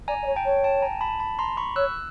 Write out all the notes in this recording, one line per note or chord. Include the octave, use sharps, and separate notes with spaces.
D5 G#5 A#5
D5
C#5
G5 A5
C#5
G5 A5
G#5 A#5
A5 B5
A5 B5
A#5 C6
B5 C#6
C#5 E6 F#6